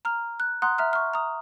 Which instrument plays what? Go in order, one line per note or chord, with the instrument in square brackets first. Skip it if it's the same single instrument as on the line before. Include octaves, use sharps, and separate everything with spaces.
[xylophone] A#5 F6
F#6
F#5 A#5 C6 D#6 F#6
E5 A#5 F6
C#6 F6
A#5 D#6